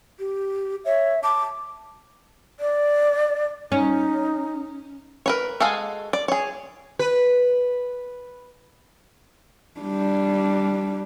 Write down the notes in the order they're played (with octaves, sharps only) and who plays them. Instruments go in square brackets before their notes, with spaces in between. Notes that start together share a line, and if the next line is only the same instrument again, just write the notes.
[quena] G4
[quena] C#5 [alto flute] E5
[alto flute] A5 [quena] D6
[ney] D5
[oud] C#4 [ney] D#4
[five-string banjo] A#4 B4 C#5
G#3 F#4 A4 F5 G#5
D5
G#4 C#5
[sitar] B4
[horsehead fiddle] G3 D4